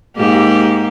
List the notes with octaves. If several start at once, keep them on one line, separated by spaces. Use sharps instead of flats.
G#2 A#3 G4